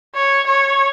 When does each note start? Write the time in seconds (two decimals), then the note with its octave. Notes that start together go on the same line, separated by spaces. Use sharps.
0.15 C#5
0.48 C#5